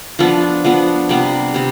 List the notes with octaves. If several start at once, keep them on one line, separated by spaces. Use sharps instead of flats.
F3 B3 D4
F3 B3 D4
C3 G3 B3
C3 G3